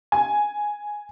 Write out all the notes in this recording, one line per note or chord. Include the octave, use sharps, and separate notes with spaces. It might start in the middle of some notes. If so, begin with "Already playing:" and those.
G#5